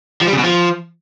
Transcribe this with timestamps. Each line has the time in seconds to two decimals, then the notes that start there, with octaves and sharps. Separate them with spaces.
0.21 F3
0.27 G3
0.32 C#3
0.38 B2
0.44 F3